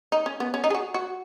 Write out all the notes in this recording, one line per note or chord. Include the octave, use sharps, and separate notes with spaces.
D#4
C#4
B3
C#4
D#4
G#4
F#4
F#4